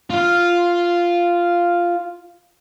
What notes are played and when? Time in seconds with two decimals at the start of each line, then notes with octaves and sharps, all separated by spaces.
0.10 F4 F5